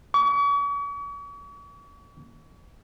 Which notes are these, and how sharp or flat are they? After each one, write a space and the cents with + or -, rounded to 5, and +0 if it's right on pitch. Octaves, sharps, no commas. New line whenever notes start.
C#6 +45